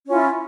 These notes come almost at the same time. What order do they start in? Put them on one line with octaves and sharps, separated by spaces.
C#4 F4 E4